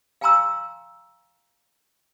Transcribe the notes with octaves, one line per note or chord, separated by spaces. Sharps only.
F5 G5 G#5 A#5 C6 E6